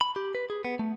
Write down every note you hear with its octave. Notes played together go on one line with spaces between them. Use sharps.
B5
G4
B4
G#4
B3
A3